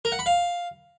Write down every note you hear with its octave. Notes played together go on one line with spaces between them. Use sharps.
A#4
F#5
B5
F5